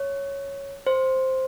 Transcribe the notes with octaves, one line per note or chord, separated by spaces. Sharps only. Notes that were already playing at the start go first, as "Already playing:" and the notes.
Already playing: C#5
C5